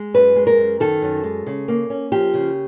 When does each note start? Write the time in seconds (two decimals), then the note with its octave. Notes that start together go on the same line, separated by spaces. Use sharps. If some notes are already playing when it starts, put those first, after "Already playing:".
Already playing: G#3
0.14 F#2 B4
0.36 G#3
0.47 A#4
0.58 F#2
0.80 D#3 A4
1.02 F#2
1.23 G#3
1.47 C#3
1.68 A#3
1.90 C#4
2.12 F3 G4
2.34 C#3